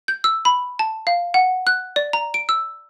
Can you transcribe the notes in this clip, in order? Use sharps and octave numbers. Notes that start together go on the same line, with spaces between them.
G6
E6
B5
A5
F5
F#5
F#6
D5
A#5
D7
E6